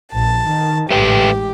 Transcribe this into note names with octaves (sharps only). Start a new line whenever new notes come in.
A#1 A5
D#3
A1 G#2 A3 G4 B4 G5